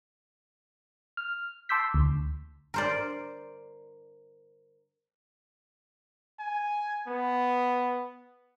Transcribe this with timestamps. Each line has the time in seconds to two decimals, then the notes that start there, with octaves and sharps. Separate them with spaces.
1.17 F6
1.69 A5 C6 D6 E6 G6 B6
1.94 D2
2.74 A#4 C5 D5
6.39 G#5
7.07 B3